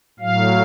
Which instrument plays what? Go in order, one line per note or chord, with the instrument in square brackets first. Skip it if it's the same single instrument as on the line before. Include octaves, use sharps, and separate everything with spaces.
[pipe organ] A2 F#3 F5